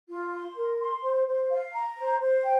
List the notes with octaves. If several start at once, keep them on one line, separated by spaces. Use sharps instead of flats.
F4
C6
A#4
C6
C5
C5
F5
A#5
C5
C5
G5